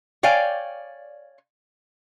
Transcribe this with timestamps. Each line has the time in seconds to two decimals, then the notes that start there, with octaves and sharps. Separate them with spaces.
0.23 C#5 D5 F5 G5 G#5